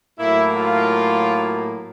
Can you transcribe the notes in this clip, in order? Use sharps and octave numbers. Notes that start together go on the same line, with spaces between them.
A2 F#3 A#3 E4
F4